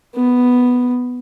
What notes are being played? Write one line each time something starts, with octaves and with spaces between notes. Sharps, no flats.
B3